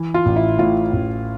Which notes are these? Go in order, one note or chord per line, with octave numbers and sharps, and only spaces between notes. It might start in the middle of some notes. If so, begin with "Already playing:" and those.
Already playing: E3
F4
A1
E4
A2 F4
A1